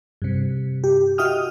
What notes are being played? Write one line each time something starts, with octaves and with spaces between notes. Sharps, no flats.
G2 C3
G4
F#4 D#5 E5 G5 D#6 F6